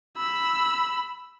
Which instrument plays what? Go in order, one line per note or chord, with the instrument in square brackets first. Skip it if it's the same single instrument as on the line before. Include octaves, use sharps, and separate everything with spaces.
[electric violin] B5 E6